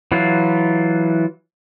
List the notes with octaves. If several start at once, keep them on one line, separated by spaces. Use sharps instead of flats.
E3 F#3 E4 F4